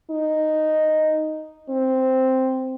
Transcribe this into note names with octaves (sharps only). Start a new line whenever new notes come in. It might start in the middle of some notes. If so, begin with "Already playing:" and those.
D#4
C4